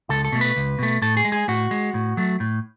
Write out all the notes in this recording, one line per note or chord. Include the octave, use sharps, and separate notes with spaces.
C#2 A4
A4
B2 A3
B4
C#2
B2 A3
A2 A4
G#4
G#3
G#4
A2 F#4
G#3
A2
F#3 A3
A2